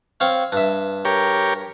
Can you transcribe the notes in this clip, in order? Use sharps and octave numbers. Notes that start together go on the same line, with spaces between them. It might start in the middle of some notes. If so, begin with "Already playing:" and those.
C4 C#5 F5
G2 E5
G4 A#4 C#5